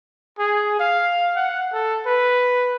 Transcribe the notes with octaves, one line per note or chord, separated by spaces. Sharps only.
G#4
F5
F#5
A4
B4